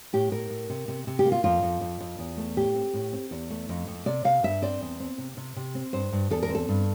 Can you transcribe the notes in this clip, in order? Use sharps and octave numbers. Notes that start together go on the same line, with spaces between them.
A2 G4
A2 A#4
A2
C3
C3
C3
G4
A#3
F4
F2 F4
F2
F2
F2
E2
A3
A2 G4
C4
A2
C4
E2
A3
F2
F2
C3 D5
C3 F5
G2 E5
C4 D5
E2
C4
C3
C3
C3
C4
G2 C5
G2
E2 A4
A#4
C4
A4
G2